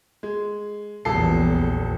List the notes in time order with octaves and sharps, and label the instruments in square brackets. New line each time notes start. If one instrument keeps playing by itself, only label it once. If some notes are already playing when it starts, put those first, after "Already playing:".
[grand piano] G#3
[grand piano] D#1 A4 C7 [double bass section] A#1 E2 A#2